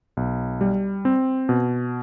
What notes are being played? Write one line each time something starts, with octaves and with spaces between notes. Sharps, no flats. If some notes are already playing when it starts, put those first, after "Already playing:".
B1
G3
C4
B2